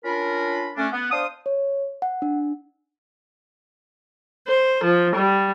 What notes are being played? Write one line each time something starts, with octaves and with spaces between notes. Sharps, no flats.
C#4 D4 F4 A#4 B5
A3 C#4 D4
B3
D4 C5 F5 D#6
C#5
F#5
D4
C5
F3
G3